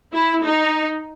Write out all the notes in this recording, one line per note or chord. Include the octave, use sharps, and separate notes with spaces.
E4
D#4